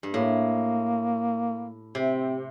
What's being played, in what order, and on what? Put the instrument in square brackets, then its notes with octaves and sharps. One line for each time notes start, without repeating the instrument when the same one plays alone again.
[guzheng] G2
[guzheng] A2 [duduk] A#3
[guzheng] C3 [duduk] C4